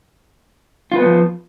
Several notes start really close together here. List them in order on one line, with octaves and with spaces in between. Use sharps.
F4 B4 B3 F3